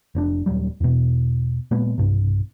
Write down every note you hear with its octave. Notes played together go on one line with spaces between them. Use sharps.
F1 C#4 D4
D#1 B1 F#3 G3
E2 B2
A#2 F#3 G#3 B3
B1 G2 C3